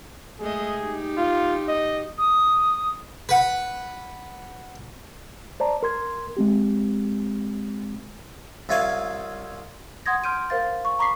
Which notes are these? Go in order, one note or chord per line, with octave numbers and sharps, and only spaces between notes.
G#3 A3 G#4 D#5
D#4 G4
F4
D#5
D#6
B4 F#5 B5
C5 D5 A5 A#5
A#4 C6 G#6
G#3 C4 G4
C2 C3 F4 C#5 F5 G#5
F#5 C6 D#6 G#6 A#6
C6 F6 G6 D7 D#7
A#4 C5 F5 A6
C#6
A#5 B5 C#6 D6 B6 C7